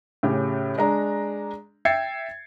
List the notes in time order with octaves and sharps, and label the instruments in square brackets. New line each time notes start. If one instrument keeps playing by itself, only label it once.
[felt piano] A2 C#3 G4
G#3 D4 A#5
E5 G5 G#6 A6 C7 C#7